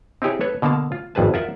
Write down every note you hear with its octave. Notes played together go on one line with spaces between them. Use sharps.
C4 D#4 E4 G4 G#4 C#5
A4 B4 C#5
B2 D3 A#3 F5 A5
F4
G#1 F2 G#4 B4 A5
F4 A#4 E5 F#5